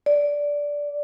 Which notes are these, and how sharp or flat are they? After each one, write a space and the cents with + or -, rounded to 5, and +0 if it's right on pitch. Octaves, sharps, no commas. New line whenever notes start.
D5 -10